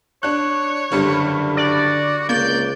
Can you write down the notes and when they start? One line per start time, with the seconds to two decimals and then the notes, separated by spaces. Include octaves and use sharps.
0.23 D4 C#5 F#6
0.92 F#1 G2 D3 G3
1.57 F#4 D5
2.29 C#2 A#3 D5 G6